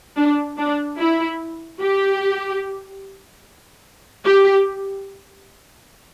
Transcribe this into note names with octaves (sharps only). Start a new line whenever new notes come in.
D4
D4
E4
G4
G4